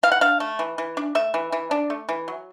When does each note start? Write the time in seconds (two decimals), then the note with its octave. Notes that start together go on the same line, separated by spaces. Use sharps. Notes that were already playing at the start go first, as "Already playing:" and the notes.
0.03 E3 F5
0.12 F#5
0.21 D4 F5
0.40 A3
0.59 E3
0.78 E3
0.97 D4
1.15 A3 E5
1.34 E3
1.52 E3
1.71 D4
1.90 A3
2.09 E3
2.28 F#3